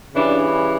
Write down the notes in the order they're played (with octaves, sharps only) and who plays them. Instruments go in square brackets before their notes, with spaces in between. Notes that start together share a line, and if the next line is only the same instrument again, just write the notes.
[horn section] C#3 E3 G3 D4